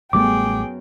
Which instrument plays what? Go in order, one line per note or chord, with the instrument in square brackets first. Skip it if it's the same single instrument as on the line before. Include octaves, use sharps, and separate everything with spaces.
[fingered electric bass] A1 G3 A3 [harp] F#2 B3 [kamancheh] G#4 G5 [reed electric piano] D6